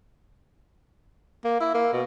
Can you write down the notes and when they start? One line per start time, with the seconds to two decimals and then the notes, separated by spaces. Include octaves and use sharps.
1.45 A#3
1.60 E4
1.74 A#3
1.93 B2